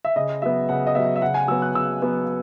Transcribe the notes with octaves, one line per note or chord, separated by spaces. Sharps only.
E5
C#3 D#5
F#3 B3 E5
C#3 F#5
D#5
F#3 B3 E5
E5
C#3 F#5
G#5
F#3 B3 E6
F#6
C#3 E6
F#3 B3